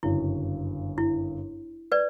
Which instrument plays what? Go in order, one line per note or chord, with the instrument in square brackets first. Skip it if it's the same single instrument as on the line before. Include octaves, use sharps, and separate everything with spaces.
[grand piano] G1 F#2 C#3 [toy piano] E4
[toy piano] E4
B4 D5